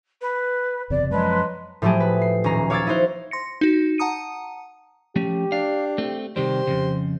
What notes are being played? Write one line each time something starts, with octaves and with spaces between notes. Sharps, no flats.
B4
F#1 E2 C3 D5
F#2 F3 F#3 G#3 B4
A2 F3 F#3 A3 G4 G#4
B4
C7
D#1 C#4 A#5 C7
C#5 F5 D6 E6 G#6 A6
D#4 E4 F#4 C5 F5
C6 A#6 C#7
D#4 F#4
F#5 A5 A#5 D#6 C#7 D#7
F3 A3 C#4 G4
D4 F5
A3 C4
C3 D#3 G3 G4 C5
F2 G#2 C#3